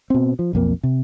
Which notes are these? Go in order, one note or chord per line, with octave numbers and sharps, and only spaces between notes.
B2 C4
F3
B1 F2 A#3
C3